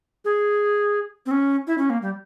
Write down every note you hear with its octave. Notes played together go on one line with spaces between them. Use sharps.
G#4
C4
C#4
E4
C#4
A#3
G3